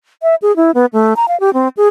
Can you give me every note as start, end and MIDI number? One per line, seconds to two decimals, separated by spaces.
0.23 0.35 76
0.42 0.55 68
0.56 0.71 64
0.75 0.86 59
0.93 1.14 57
1.16 1.26 82
1.28 1.39 77
1.40 1.53 67
1.54 1.68 60
1.77 1.88 68